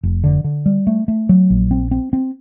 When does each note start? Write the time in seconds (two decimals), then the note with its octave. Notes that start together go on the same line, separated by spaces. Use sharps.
0.03 F1
0.24 D3
0.44 D3
0.66 G3
0.87 A3
1.08 A3
1.29 F#3
1.50 A#1
1.71 C4
1.91 C4
2.13 C4